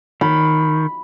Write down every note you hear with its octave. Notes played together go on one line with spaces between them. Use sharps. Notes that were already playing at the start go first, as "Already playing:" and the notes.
D#3 B5